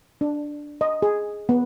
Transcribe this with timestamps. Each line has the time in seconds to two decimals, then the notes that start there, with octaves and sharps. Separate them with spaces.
0.21 D4
0.81 D#5
1.02 G#4
1.49 B3